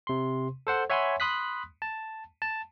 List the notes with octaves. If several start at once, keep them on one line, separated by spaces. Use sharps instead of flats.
C3 C6
A4 C5 F#5
C#5 E5 F#5 G#5 B5 C6
B5 C6 D#6 F#6 B6
A5
A5